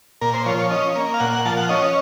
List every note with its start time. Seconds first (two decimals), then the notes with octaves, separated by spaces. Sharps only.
0.21 A#2 A#4
0.34 C5
0.46 F3 C#5
0.58 C#5
0.71 C#4 D#5
0.96 A#3
1.14 F5
1.20 A#2 F#5
1.33 F#5
1.45 F3 A5
1.57 F#5
1.69 C#4 D#5